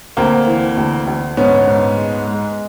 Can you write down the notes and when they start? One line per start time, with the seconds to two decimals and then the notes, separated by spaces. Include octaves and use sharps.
0.17 D2 A#3 C4
0.47 E3
0.77 D2
1.07 D2
1.37 G#2 B3 C#4
1.67 G#2
1.97 G#3
2.28 G#3